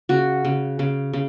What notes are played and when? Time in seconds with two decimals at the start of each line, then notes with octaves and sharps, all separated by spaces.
0.09 C#3 F#4
0.45 C#3
0.79 C#3
1.13 C#3